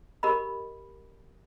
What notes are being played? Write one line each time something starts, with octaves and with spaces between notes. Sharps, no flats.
G4 A#4 D#5 B5